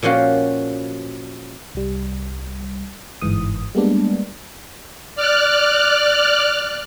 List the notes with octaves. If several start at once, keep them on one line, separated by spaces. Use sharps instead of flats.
A#2 F3 C#4 F#4 G4
C2 G3
G1 G#2 E3 D#6
G3 G#3 A#3 B3 D4
D5 F6 F#6